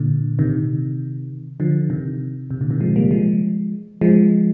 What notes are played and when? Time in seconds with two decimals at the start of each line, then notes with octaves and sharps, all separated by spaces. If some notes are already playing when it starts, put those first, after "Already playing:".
Already playing: A#2 D3
0.39 C3 D#3
1.60 D3 F3
1.90 C3 D#3
2.50 C3
2.61 A#2 D3
2.70 C3 D#3
2.81 F3 G#3
2.96 G3 A#3
3.11 F3 G#3
4.01 F3 G#3